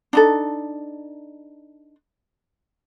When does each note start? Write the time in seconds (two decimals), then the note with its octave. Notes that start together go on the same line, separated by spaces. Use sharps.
0.13 D4 D#4 A4